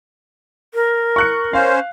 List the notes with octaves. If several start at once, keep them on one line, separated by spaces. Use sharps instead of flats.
A#4
C#6 F#6 C#7
C#4 C5 F5